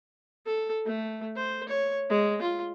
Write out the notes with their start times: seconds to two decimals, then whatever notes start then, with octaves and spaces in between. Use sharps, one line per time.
0.46 A4
0.86 A3
1.36 C5
1.69 C#5
2.10 G#3
2.42 F4